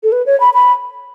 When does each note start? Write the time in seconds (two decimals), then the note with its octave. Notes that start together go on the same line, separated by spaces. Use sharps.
0.03 A4
0.12 B4
0.26 C#5
0.40 B5
0.54 B5